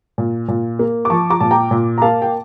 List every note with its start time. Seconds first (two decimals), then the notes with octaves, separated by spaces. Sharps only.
0.18 A#2
0.48 A#2
0.79 A#3
1.05 D6
1.10 F3 A5 C#6
1.30 A#5 D6
1.40 A#2 A5
1.51 G5 A#5
1.71 A#2
1.98 A#5
2.02 A#3 F5 A5
2.22 G5